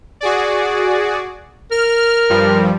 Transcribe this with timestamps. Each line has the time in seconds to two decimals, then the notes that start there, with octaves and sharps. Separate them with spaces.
0.21 F#4 G#4 D5
1.71 A#4 F6
2.30 G2 F3 G3